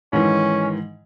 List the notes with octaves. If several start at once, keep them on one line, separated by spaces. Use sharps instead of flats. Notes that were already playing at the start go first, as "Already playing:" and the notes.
G#2 D#3 E3 C#4